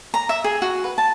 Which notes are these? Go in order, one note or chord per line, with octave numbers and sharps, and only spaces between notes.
A#5
E5
G#4
F#4
B4
A5